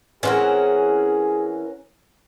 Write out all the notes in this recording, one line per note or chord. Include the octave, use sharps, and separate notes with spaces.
E3 C4 C#4 F#4 G#4 A#4